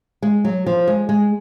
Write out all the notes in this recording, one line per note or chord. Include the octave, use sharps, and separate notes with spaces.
G#3
F#3
F3
G#3
G#3